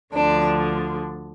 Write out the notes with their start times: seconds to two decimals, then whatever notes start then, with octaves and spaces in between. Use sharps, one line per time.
0.14 D2 D3 F3 D4